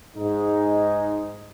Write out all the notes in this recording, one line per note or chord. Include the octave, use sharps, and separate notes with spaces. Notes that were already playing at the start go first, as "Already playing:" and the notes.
G#2 G#3 D#4